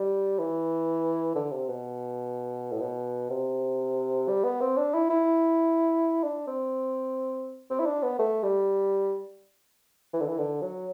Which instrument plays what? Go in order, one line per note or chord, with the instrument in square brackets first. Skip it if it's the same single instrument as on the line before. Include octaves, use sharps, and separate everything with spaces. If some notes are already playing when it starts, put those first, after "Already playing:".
Already playing: [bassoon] G3
E3
D3
C3
B2
A2
B2
C3
G3
B3
C4
D4
E4
E4
D4
C4
C4
E4
D4
B3
A3
G3
E3
D3
E3
D3
F#3